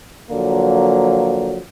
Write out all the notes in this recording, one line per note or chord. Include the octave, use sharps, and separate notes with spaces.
D3 F3 F#3 A#3